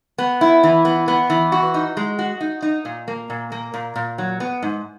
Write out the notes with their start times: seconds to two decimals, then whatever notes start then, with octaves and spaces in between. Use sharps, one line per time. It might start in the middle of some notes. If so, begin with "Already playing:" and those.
0.18 B3
0.41 E4
0.64 E3
0.85 B3
1.08 B3
1.30 E3
1.52 F#4
1.74 D#4
1.97 G#3
2.19 F#4
2.41 D#4
2.62 D#4
2.85 A#2
3.08 A#3
3.30 A#2
3.52 A#3
3.74 A#2
3.96 A#2
4.18 F#3
4.40 B3
4.62 G#2